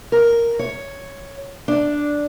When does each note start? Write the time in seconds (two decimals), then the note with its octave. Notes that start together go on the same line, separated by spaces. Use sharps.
0.12 A#4
0.59 C#5
1.68 D4